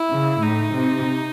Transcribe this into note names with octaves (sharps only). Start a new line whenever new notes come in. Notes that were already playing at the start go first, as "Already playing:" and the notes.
Already playing: E4
C#3
A2 D#4
C3